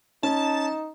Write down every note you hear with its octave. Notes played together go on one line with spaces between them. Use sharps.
C#4 D#4 A5